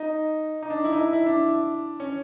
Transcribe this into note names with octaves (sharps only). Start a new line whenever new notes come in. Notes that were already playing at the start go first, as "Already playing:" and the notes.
Already playing: D#4
D#4
D4
E4
D#4
E4
E4
D4
C#4